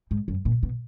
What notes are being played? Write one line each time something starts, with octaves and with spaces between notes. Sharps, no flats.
G#2
F#2
A#2
B2